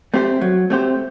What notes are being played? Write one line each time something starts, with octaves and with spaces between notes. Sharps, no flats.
A3 C4 G4 C5
F#3
A3 C4 G4 C5